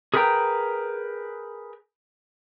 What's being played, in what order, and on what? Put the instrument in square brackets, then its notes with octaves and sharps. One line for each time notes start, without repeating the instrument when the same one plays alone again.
[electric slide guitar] G#4 A#4 B4 C#5 G5 A#5